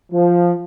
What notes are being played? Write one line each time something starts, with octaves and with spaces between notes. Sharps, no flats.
F3